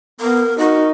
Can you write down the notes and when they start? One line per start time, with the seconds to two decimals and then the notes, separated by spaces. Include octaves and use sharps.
0.20 B3 A#4
0.58 D#4 F#4 A#4